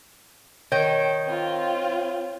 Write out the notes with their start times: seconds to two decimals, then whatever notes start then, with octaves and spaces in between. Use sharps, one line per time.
0.72 D#3 C#5 G6
1.25 C4 F4